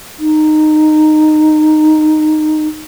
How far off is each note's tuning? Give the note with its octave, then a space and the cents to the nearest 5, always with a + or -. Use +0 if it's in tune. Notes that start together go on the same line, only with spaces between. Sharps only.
D#4 -15